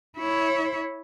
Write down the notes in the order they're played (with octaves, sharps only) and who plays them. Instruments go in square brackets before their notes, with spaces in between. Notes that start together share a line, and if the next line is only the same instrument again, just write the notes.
[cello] E4 C#5